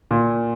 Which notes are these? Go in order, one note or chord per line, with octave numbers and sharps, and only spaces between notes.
A#2